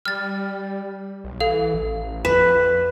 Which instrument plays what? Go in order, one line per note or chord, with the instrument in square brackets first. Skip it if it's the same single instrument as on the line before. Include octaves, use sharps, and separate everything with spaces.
[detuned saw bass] G3 [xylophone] F6 A6
[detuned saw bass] B1
[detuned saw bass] E3 [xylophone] A4 F5
[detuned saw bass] A1
[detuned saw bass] F2 [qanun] B4 [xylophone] E7